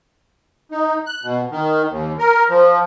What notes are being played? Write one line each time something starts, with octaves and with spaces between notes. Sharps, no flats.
D#4
F#6
B2
D#3
D#2
A#4
F3